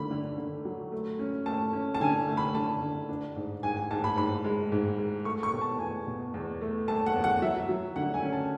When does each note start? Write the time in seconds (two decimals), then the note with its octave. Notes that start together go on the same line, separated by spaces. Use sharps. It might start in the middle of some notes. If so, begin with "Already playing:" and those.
Already playing: D3 A3 B5
0.11 D3
0.38 D3
0.65 F#3
0.92 A3
1.19 C#4
1.46 A3 A5
1.73 C#4
1.95 A5
2.00 D3 G#5
2.27 A3
2.37 B5
2.54 D3 A5
2.82 D3
3.09 D4
3.36 G#2
3.63 G#2 G#5
3.77 G#5
3.91 G#2 A5
4.04 B5
4.17 G#2 B5
4.44 G#3
4.72 G#2
4.98 G#3
5.25 A3 C#6
5.43 C#6
5.53 B2
5.61 A5
5.79 E2 G#5
6.07 B2
6.34 E2
6.61 A3
6.88 A3 A5
7.06 F#5
7.15 E2
7.24 F#5
7.42 F#3 E5
7.69 F#3
7.96 D3 F#5
8.14 G#5
8.23 C#4
8.33 A5